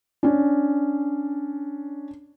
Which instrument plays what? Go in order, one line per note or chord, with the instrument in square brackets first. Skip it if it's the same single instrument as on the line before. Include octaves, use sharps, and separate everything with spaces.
[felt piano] C#4 D4